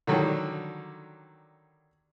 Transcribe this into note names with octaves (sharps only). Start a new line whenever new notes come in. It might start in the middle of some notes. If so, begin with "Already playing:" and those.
D3 D#3 F#3 G3